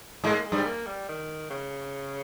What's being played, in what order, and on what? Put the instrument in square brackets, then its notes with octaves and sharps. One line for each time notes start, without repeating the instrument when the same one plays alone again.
[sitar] G#2 G#3 [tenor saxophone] A#3
[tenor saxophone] G#3
[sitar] G2 G3
[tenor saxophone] A#3
G3
D#3
C#3